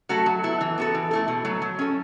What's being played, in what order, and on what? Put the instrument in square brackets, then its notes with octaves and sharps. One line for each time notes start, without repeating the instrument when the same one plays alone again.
[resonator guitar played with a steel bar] F#3 A3 F#4 A4
F#3
B3 E4 A4
E3
B3 F#4 A4
E3
A3 E4 A4
B2
F#3 A3
F#3
C#4 A4